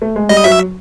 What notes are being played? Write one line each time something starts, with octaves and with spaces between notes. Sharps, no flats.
A3
G#3
G3 D#5
F#3 E5